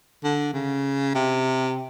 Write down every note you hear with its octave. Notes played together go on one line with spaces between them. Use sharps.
D3
C#3
C3